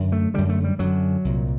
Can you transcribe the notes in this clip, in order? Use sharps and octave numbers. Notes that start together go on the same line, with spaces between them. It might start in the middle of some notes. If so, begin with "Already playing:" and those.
Already playing: F#2 D3
A3
F#2 D3 G3
A3
G3
F#2 D3 F#3
C2 A#2